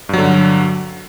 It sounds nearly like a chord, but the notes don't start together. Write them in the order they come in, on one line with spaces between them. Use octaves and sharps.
G2 F#3 D3